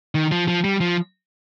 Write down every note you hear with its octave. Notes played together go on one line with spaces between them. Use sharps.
D#3
F3
F3
G3
F3